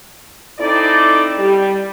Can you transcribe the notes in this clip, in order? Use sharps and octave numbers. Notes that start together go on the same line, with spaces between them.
C4 D#4 E4 A4 D5
G3